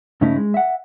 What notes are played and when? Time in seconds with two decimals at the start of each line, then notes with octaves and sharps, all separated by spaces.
0.21 G2 C#3 A3 C#4 D#4 E4
0.36 G#3
0.54 E5 F#5